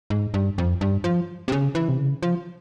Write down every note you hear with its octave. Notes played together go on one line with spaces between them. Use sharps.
G#2
G2
F2
G2
F3
C3
C#3
E3
C3
C#3
F3